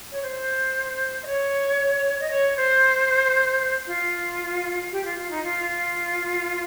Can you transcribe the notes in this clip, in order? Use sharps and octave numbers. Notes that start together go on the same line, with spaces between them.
C#5
C5
D#5
C#5
D#5
C#5
C5
F4
G4
F4
F4
D#4
F4